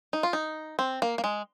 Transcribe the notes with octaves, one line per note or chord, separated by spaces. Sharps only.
D#4
F4
D#4
C4
A#3
A#3
G#3